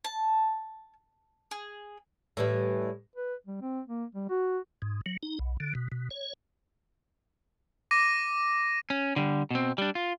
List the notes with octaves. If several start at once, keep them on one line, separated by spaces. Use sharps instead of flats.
A5
G#4
A2 E3 G3
B4
G3
C4
A#3
G3
F#4
G#2
F#3
D#4
B1
D3
B2
B2
C#5
D6 A#6 D#7
C#4
D3 G3
B2 C4
G3 D4
F4